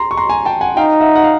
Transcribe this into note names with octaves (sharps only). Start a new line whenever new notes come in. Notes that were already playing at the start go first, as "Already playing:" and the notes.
Already playing: A#5 C6
C#6
A#5 C6
G#5 A#5
G5 A5
F#5 G#5
D#4 F5 G5
E5 F#5
F#5
F5